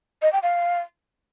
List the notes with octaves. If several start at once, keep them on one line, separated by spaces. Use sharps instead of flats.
D#5
G5
F5